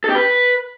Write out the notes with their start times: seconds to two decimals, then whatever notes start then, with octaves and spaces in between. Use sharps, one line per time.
0.04 A4
0.09 G4
0.15 B4